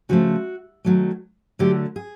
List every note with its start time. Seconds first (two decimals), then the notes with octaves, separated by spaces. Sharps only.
0.09 C#3 F3 A3 F#4
0.85 D#3 F#3 A3
1.59 D3 F#3 A3 G4
1.96 G#4